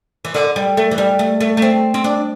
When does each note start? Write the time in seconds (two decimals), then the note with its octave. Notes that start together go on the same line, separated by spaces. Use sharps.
0.25 E3
0.34 D3
0.56 G3
0.77 A3
0.91 E3
0.98 G3
1.19 A3
1.40 A3
1.57 A3
1.62 C4
1.94 C4
2.04 D4